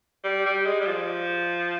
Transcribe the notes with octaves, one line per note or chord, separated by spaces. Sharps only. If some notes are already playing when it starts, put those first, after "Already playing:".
G3
G3
G#3
G3
F3